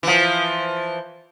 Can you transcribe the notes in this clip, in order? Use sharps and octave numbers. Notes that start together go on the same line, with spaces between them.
E3 F3